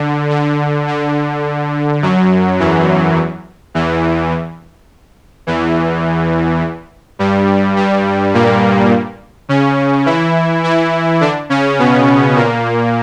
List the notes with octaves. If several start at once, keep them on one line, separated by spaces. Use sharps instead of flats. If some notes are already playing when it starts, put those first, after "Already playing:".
Already playing: D3
D3
D3
F#2 F#3
E2 E3
E2 E3
E2 E3
G2 G3
G2 G3
A#2 A#3
C#3 C#4
E3 E4
E3 E4
D3 D4
C#3 C#4
B2 B3
A#2 A#3